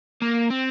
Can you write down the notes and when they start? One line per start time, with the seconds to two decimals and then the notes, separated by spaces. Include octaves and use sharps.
0.22 A#3
0.50 C4